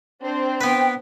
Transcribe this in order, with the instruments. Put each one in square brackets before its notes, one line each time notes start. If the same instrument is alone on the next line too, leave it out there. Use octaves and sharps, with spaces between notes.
[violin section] C4 D4 C5
[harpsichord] B3 B4 [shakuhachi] G5